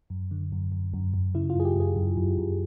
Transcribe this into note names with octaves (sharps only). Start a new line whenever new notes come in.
F#2
D3
F#2
F#2
F#2
F#2
C#3 E4
F4
F#2 G#4
G4
F#2 G#4
F#2
F#2
F#2